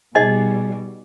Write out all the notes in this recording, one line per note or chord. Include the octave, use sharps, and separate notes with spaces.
B2 G3 D#4 G#4 D#5